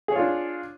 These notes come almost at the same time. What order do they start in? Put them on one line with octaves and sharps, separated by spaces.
G#4 C#5 F4 D4